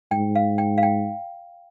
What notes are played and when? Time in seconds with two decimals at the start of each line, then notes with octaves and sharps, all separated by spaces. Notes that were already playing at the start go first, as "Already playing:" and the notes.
0.11 G#2 G5
0.35 F5
0.58 G5
0.78 F5
0.83 G5